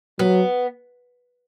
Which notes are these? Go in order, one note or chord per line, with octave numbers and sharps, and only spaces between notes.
F#3 B3